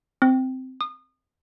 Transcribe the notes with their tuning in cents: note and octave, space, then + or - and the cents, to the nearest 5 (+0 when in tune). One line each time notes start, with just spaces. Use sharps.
C4 -10
D#6 -30